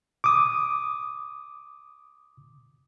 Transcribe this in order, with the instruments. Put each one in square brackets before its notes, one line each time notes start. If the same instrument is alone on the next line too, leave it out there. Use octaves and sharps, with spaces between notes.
[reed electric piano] D6 D#6